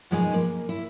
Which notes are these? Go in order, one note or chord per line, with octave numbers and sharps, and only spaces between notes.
F#2 B2 F3 G#3 D#4 G#5
A#3
E4